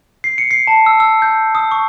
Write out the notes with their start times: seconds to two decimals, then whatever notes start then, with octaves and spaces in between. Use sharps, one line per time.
0.24 C7
0.38 C#7
0.51 C7
0.67 A5
0.86 E6
1.00 E6
1.22 G6
1.55 D#6
1.71 C#6